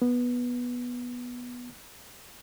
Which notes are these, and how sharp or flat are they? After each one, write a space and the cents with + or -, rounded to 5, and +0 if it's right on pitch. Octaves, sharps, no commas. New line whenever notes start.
B3 -10